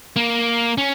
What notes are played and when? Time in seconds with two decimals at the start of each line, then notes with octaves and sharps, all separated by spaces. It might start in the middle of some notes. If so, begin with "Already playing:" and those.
0.16 A#3
0.78 C#4